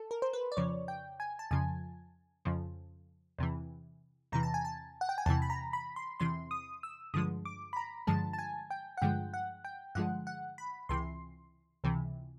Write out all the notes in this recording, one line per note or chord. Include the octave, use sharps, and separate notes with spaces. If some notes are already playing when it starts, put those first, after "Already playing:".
Already playing: A4
A#4
C5
B4
D5
F2 C#3 F3 C#5
G5
G#5
A5
F2 C#3 F3 G#5
F2 C#3 F3
E2 C3 E3
E2 C3 E3 A#5
A5
G#5
A5
F#5
G5
G#5
E2 C3 E3 A5
B5
A#5
B5
C6
E2 C3 E3 C6
D#6
E6
G2 D3 F3 G#3 D#6
D6
B5
A#5
G2 D3 F3 G#3 A5
A5
G#5
G5
F#5
G2 D3 F3 G#3 G5
F#5
G5
G2 D3 F3 G#3 F#5
F#5
B5
C#2 C3 E3 C6
C#2 C3 E3